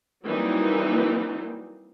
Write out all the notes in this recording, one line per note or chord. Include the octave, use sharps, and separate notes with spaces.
E3 F#3 G3 A#3 C4 D#4